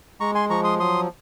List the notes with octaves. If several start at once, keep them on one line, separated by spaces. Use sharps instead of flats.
G#3 A#5 C#6
G#5 C6
F3 A#5 C#6
C6 D#6
F#3 C6 D#6